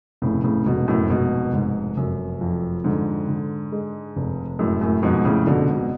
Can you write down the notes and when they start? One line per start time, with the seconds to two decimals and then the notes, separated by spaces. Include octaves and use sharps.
0.22 F1 A2 C#3
0.44 A2 C#3
0.66 F1 G#2 B2
0.88 F#2 A2
1.10 F1 G#2 B2
1.54 F1 G#2
1.97 F1 F#2
2.41 F2
2.84 G#2 D3
3.28 D3
3.72 G#3
4.16 F1
4.59 F#2 A2 G#3
4.81 F#2 A2
5.03 F2 G#2 B2
5.25 A2 C#3
5.47 F1 B2 D3
5.69 G#2 B2